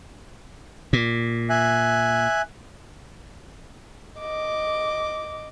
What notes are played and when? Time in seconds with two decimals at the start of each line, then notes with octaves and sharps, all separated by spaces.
0.93 A#2
1.50 E5 G#5 F#6
4.19 D#5 D6